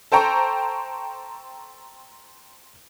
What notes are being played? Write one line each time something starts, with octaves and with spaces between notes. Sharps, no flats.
A4 C5 G5 A#5 C#6